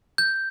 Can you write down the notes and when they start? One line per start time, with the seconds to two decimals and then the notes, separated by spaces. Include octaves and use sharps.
0.18 G6